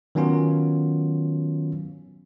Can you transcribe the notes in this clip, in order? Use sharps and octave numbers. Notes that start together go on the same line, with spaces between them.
D#3 F#3 B3 C#4 F4